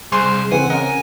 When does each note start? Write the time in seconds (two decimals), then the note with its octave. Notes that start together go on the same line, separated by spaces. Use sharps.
0.12 C2 G#4 C5 G#5 C6 C#6
0.52 C#3 E3 C4 F#5 G#5
0.70 C#3 A#4 D#5 F#5